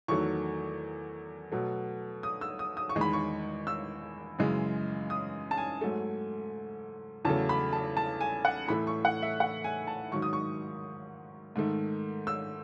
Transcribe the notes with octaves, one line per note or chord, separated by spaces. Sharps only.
E2 D#3 F#3 A3 C#6
B2 F#3 A3
D#6
E6
D#6
D#6
C#6
E2 D#3 G#3
B5
C#6
E6
F#2 C#3 E3 G#3
D#6
A5
G#5
G#2 F#3 A3
E2 C#3 F#3 A3 A5
B5
A5
A5
G#5
F#5
A2 E3 A3 B5
C#6
F#5
E5
F#5
G#5
A5
G#2 D#3 F#3 C#6
D#6
C#6
G#2 D#3 A3
E6